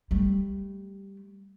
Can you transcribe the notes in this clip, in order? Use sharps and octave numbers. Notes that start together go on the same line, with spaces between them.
G3 A3